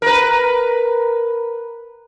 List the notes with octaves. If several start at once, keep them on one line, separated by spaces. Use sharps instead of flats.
A#4 B4